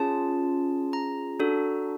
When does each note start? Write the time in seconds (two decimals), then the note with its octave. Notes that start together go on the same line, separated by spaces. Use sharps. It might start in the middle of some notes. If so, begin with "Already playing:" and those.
Already playing: C#4 F4 G#4 A5
0.93 A#5
1.40 D4 F#4 A4